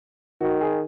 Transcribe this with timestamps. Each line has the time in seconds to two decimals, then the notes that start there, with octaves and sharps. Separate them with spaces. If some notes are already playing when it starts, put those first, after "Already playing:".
0.40 D#3 F#4
0.61 G#4